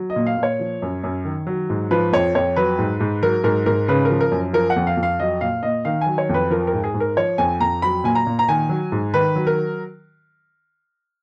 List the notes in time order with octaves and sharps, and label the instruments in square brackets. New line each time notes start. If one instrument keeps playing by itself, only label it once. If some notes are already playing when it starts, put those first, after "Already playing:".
Already playing: [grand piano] F#3
D#5
A#2
F5
A#2
C#5
F3
F#2
F#2
D#3
F#3
G#2
F3 B4
F2 C#5
F2 C#5
F#3 B4
G#2
G#2
F#3 A#4
G#2 A#4
G#2 A#4
C#3 B4
A#4
F3
A#4
F#2
F3 A#4
F#5
F2
F5
F2
F5
F#3 D#5
A#2 F5
A#2 D#5
D#3 F5
G#5
F#3
C#5
F2
B4
F3 A#4
A#4
G#2
G#4
G#2
A#4
F3 C#5
F2 G#5
F2 A#5
F#3 B5
A#2 G#5
A#5
A#2
A#5
D#3 G#5
F#3
G#2
D#3 B4
F#3
A#4